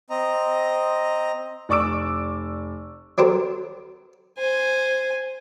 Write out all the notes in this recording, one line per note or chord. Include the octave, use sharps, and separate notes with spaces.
C4 D#5 A#5
F1 D5 C#6 D6 E6 D7
F#3 C4 G4 A4 A#4 C5
C5 G#5